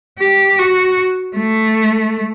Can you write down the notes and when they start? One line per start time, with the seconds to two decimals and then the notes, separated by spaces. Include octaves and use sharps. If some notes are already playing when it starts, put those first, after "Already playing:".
0.19 G4
0.59 F#4
1.37 A3